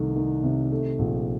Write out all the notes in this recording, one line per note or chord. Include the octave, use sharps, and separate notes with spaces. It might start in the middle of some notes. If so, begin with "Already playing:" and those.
Already playing: C2 D#3 A3
D#3
C3
A3
A#1